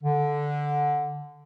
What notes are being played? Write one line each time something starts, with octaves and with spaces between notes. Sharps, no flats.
D3